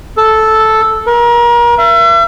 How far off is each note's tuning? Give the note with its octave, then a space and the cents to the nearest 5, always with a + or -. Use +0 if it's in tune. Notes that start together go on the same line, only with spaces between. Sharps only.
A4 -5
A#4 +35
E5 +40